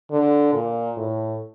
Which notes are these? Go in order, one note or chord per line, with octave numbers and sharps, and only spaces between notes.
D3
A#2
A2